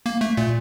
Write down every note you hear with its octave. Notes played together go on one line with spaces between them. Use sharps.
A#3
A3
A#2